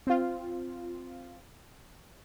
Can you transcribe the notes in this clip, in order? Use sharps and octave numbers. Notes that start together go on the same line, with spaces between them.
C4 F4